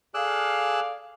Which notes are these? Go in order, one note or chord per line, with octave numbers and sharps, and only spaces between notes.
G#4 A4 D5 F5 E6 F#6